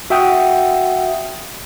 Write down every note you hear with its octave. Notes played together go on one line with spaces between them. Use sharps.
F#4 E5 F#5 G5 D#6